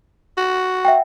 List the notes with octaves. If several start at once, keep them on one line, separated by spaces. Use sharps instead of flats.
F#4
E5 F#5 G5